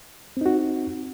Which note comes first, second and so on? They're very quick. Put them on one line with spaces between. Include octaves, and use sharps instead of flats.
C4 D#4 F#4